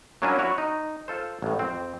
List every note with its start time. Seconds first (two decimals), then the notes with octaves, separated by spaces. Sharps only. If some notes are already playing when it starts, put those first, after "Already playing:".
0.22 F#3 A#3 C#4 D4 E4 G#5
0.38 E4 F#4 C#5
0.58 D#4
1.08 F4 A4 C5
1.42 A1 A2
1.59 F2 C4